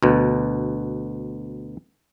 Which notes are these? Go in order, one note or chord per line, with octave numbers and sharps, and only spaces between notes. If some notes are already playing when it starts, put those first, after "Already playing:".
D2 B2